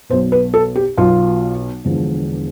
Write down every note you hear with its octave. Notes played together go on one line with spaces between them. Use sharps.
B1 B2 C5
B4
A4
G4
B1 B2 F4
E1 E2 D3 F3